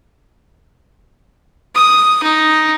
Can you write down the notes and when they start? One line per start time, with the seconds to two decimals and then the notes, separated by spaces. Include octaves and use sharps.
1.75 D#6
2.23 D#4